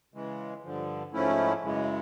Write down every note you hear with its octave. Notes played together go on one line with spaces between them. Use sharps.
C#3 E3 G#3
G2 D3 F3
G#2 F3 A3 C#4 E4
F#2 C#3 E3 G#3